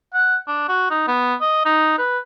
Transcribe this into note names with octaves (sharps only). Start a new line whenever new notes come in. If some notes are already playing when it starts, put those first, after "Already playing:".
F#5
D4
F#4
D#4
B3
D#5
D#4
B4